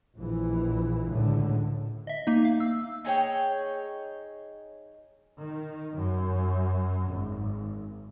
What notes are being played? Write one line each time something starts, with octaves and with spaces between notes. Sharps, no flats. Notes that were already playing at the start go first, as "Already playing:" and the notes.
A#1 E3
C#2 A2 D3
D#5 E5
A#3 D#4
F5
E6
D#4 G#4 C#5 G5
D#3
F#2
G#1